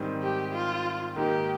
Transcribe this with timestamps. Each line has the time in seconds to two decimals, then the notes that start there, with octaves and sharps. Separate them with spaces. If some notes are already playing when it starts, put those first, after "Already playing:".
Already playing: G#2 D#3 G3 C4
0.22 G4
0.53 F4
1.16 G#2 D#3 A#3 D#4 G4 A#4